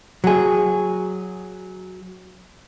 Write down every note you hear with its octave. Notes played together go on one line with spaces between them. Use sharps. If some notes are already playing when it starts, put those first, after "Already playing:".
F#3 G#4